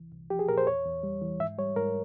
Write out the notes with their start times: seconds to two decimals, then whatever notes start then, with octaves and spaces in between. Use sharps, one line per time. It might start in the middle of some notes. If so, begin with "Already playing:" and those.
Already playing: C2 E3
0.12 C2
0.30 F3 G4
0.39 G#4
0.49 A#2 A#4
0.58 C5
0.67 E2 C#5
0.85 E2
1.03 G3
1.22 E3
1.40 G#2 E5
1.58 G3 C#5
1.76 G#2 A#4